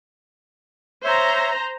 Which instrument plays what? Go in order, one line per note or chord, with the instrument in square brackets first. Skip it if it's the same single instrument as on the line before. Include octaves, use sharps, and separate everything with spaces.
[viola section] C5 A#5 [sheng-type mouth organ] C#5 E5